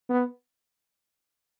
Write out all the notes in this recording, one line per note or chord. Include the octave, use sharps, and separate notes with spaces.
B3